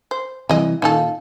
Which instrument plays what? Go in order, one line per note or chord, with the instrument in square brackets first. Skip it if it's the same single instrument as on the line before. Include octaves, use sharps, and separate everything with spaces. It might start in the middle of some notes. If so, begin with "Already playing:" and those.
[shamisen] C5
[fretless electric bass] C3 E3 G3 [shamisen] G#3 D#5
[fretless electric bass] A#2 [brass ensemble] D#3 F4 F5 [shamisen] C#4 D#4 A4